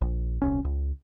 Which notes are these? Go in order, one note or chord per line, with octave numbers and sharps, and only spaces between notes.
A#1
D#1 C2 C#4
C#2